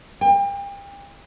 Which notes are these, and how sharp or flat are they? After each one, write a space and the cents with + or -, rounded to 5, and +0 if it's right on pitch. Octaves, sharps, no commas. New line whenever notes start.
G5 +35